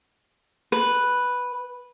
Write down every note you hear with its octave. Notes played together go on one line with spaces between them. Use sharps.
B4